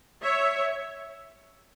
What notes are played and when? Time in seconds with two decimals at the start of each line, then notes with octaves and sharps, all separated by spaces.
0.22 C#5 E5